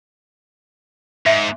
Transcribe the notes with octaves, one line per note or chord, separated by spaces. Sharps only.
G#2 E5